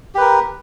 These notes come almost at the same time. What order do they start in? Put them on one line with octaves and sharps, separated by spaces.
G4 B4 A#4